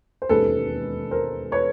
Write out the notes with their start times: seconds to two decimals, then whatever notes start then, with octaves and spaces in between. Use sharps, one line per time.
0.22 C5
0.29 E1 D#2 D#3 G#3 C#4 A4 B4
1.11 A#4 C5
1.52 B4 C#5